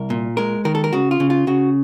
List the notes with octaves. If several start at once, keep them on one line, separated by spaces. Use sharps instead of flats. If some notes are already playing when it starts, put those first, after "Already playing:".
Already playing: C2 A#4
A#2
G#3 A#4
D#3 A#4
A4
A#4
C#3 F#4
F4
C#3
F4
C#3 F#4